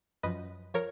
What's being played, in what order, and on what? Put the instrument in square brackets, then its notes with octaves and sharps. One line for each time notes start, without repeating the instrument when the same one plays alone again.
[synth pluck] F#2 F3 B4 D#5
F3 A#4 C#5